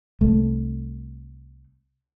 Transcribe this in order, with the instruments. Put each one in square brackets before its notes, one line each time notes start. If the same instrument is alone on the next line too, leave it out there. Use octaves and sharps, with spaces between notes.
[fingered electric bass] C2 A3